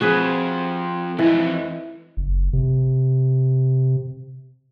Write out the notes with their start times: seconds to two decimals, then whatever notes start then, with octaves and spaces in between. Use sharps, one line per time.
0.01 F3 C4 F#4 G#4 B4
1.19 F2 E3 D#4
2.17 F#1
2.53 C3